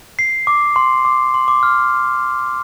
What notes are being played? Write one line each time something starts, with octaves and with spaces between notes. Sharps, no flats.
C7
D6
C6
D6
C6
D6
F6